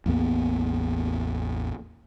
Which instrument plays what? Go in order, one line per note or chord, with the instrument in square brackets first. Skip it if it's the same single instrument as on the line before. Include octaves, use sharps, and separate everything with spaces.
[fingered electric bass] A1 E2 A#3 B3